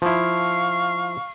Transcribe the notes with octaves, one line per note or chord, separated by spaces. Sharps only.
F3 E4 F5 C#6